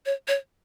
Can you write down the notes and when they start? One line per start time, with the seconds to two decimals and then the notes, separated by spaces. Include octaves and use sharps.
0.06 C#5
0.28 C#5